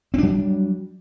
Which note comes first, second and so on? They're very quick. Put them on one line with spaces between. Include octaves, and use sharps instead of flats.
C4 D4 F#3 G3